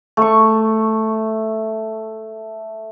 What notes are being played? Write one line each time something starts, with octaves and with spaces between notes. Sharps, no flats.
A3 C#6